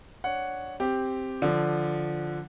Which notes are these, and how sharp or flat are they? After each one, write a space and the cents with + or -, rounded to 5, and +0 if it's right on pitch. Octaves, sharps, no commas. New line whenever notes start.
D4 +0 C#5 +0 F#5 +0
C4 +0 G4 +0
D3 +0 F3 +0